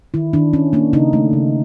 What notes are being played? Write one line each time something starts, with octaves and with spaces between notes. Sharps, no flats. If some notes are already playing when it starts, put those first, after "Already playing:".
D#3 E4
D#3 D4
D#3 C#4
A#3 D4
C#3 D#4
A3
C#3